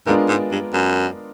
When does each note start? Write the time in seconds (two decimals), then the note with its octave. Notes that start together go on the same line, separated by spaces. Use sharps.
0.07 G#2 G#3 B3 D4 F4 A#4
0.29 G#2
0.51 G2
0.73 F#2